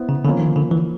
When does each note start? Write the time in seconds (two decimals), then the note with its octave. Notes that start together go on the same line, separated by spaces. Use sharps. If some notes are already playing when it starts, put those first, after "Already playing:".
Already playing: B3 E4 C5
0.09 C#3
0.25 D3 F3 A#3 C#4
0.40 D#3
0.56 D3
0.71 E3